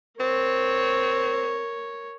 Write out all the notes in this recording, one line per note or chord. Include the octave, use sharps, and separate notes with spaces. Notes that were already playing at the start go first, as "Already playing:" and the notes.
C4 A#4 C#5